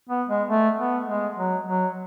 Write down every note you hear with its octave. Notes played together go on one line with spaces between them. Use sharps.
B3
G#3
A3
B3
G#3
F#3
F#3